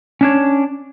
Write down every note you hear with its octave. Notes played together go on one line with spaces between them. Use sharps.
C#4 D4 C#5